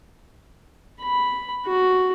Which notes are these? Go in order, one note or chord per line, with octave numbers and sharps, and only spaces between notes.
B5
F#4